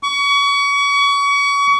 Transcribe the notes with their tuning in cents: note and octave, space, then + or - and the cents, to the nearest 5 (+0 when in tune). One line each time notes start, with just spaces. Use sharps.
C#6 +35